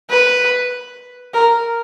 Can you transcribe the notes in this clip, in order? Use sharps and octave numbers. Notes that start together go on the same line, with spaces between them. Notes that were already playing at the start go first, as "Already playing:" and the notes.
B4
A#4